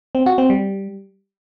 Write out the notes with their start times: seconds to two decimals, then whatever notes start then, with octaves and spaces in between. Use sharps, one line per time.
0.15 C4
0.26 F#4
0.38 C4
0.50 G3